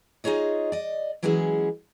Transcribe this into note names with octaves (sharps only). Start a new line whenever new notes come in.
D#4 F4 G#4 C#5 D#5
D5 D#5
E3 F#3 G#3 C#4 E4 G#4